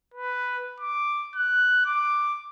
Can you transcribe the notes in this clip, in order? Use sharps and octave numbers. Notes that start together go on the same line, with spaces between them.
B4
D6
F#6
D6